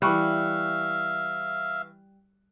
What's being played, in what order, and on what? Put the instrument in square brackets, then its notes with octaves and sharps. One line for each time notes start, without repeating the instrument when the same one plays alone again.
[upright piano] E3 C#6 F#6 [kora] G3 [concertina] E5 F5